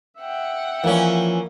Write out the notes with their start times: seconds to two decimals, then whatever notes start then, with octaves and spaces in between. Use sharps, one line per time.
0.18 E5 F#5 G5
0.84 E3 F3 A#3 C#4 D5